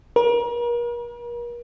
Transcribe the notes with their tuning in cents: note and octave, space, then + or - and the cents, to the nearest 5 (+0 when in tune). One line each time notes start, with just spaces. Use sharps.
A#4 +40